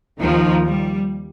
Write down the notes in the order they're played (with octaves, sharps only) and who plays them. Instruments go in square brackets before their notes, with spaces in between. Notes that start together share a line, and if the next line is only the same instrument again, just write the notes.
[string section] D#2 D#3 A#3 D#4 [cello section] F3
[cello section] G3